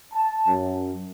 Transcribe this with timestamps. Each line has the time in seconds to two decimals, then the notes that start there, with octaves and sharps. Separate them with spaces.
0.12 A5
0.47 F#2